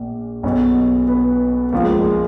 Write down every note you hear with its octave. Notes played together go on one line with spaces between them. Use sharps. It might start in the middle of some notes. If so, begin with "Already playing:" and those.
Already playing: A#1 A#2
B1 B2 C#4
B3
C#2 C#3 F3 A#3
G#3
G#3
G#3